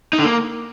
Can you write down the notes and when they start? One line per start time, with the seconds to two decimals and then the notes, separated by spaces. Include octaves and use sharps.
0.13 D#4
0.19 D3
0.25 A#3